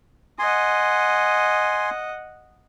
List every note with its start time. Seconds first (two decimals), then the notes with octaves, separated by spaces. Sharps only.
0.39 D#5 F#5 G#5 C6